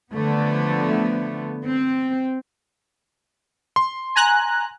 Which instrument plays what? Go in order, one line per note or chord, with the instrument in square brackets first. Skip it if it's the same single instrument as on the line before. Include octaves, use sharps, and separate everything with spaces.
[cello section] D3 F3 A3 B3
C4
[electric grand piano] C6
[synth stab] G#5 A#5 F#6